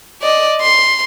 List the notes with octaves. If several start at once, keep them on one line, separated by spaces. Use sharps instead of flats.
D5 D#5
C6